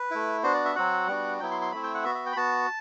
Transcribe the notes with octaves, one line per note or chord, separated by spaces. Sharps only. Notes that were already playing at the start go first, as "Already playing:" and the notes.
Already playing: B4
A3 E4
B3 D4 F#4 C5
D5
E5
F#3 C4 F#4 F#5
G3 B3 D4 F#4
F#3 B3 E4 G5
C6
C6
A3 C4 E4 B5
G5
F#5
B3 F#4 E5
E5
G5
B5
B3 F#4 A5